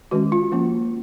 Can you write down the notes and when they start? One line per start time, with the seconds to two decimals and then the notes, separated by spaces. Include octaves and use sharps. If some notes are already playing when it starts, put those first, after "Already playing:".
0.11 D#3 G#3 C#4 F#4
0.32 F4
0.52 F3 A#3 C#4